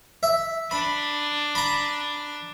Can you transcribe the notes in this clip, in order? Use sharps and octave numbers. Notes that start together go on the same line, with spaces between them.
E5
D4 B5
A#5 B5